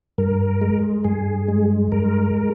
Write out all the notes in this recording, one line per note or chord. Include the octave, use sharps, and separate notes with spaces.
G2 A#4
G#3
G2 G#4
G#3
G2 A#4